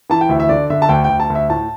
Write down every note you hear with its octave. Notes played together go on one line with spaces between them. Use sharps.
E3 A5
G5
D2 E5
E5
D3 D5
D3 E5
A5
D2 G5
G5
D2
A5
D2
E5
A2 A5